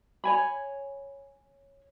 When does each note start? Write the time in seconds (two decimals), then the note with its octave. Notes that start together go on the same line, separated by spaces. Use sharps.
0.24 C#5 G#5 B5